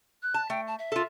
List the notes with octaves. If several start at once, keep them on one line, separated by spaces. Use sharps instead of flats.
F#6
A5
A3 G5
A5
E5
F4 A4